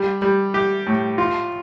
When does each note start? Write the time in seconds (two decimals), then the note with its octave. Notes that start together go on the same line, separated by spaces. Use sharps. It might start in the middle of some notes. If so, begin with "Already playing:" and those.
Already playing: G3
0.22 G3
0.54 G4
0.87 A2
1.18 F4